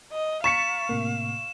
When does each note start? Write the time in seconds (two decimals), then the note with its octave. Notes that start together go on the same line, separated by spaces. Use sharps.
0.12 D#5
0.44 F5 A#5 C#6 A6 B6 C#7 E7
0.89 A2 C3 A#3